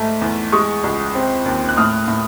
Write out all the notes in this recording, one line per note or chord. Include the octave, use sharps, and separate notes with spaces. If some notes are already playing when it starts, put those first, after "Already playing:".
Already playing: G#2 A3
E2
G#3 C#6 D#6
C#2
C4
D#2
F#6
A2 D#6 F6
A2